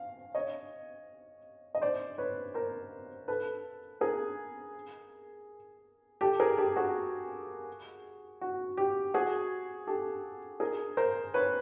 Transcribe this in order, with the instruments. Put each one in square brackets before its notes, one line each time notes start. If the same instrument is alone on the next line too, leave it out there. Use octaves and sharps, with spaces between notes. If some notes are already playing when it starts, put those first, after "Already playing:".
Already playing: [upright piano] F5
C#5 D#5
D#5
C5 D5
B4 C#5
A#4 C5
A4 B4
G#4 A#4
G4 A4
G#4 A#4
G4 A4
F#4 G#4
F#4
G4
F#4 G#4
G4 A4
G#4 A#4
A#4 C5
B4 C#5